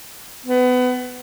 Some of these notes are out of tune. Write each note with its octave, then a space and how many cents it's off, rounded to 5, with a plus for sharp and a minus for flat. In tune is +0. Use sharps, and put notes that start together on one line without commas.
B3 +25